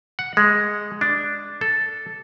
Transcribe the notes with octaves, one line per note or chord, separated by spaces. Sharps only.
F#5
G#3
D4
A4